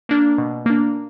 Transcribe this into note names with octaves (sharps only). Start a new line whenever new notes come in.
A#3 D4
B2
A#3 D4